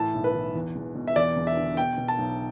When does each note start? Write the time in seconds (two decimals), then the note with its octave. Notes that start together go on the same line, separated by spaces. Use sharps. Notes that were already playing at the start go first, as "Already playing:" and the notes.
Already playing: A2 E3 A5
0.14 B1
0.24 B4
0.34 E3
0.55 E2
0.75 E1
0.95 B2
1.07 E5
1.16 E2 D5
1.37 E1
1.47 E5
1.57 D3
1.77 B2 G5
1.98 B2
2.08 A5
2.18 B1